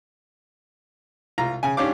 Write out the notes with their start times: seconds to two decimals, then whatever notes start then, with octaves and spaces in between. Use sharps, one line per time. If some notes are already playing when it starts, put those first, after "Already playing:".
1.38 C2 F4 A#5
1.63 C#3 G#5
1.77 G#2 C#4 D4 G4 F5 D6